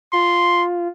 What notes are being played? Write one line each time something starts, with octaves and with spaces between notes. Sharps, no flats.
F4 C6